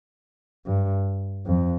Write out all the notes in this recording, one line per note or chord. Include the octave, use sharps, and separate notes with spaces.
G2
F2